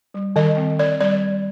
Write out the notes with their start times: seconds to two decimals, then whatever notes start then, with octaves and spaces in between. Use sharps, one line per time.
0.14 G3
0.36 D#3 D#5
0.57 C4
0.79 D#3 D5
1.01 G3 D5